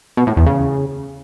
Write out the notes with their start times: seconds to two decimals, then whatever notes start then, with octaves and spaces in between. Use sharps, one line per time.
0.17 B2
0.27 A2
0.37 E2
0.46 C#3